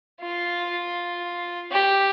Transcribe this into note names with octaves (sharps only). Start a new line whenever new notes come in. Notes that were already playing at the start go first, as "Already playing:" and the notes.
F4
G4